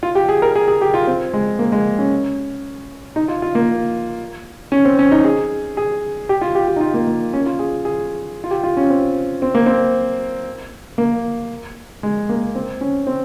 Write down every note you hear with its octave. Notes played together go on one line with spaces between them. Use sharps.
F4
G4
G#4
A#4
G#4
G#4
G4
F4
C4
G#3
A#3
G#3
C#4
D#4
F4
F4
A#3
C#4
C4
C#4
D#4
G#4
G#4
G4
F4
G4
G4
D#4
F4
A#3
A#3
C#4
F4
G#4
G#4
F4
G4
F4
C#4
C4
C4
A#3
C4
A#3
G#3
A#3
C4
C#4
C4